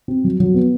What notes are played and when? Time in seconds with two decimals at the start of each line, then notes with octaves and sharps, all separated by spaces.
0.08 C4
0.24 F#3
0.40 F#3
0.54 B3